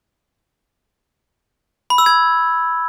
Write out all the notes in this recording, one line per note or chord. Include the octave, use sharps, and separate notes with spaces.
B5
E6
G#6